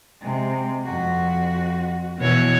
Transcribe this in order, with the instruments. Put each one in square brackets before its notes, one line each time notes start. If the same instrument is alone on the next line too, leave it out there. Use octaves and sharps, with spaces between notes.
[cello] C3 G#3
F2 F#4
[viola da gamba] B2 E3 C#5